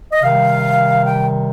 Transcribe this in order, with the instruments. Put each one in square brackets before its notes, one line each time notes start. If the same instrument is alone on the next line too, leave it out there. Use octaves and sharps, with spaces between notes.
[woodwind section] D#5
C3 D#3 G3 F5
G5